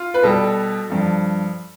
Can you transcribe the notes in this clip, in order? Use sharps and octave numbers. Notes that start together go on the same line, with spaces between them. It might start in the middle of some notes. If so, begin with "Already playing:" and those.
Already playing: F4
B4
B2 G3 A4
G2 F3